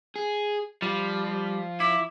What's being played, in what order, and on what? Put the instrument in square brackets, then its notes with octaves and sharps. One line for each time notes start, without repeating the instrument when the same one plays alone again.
[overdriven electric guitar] G#4
[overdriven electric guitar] F3 [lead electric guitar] G3
[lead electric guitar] E4 [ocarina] D6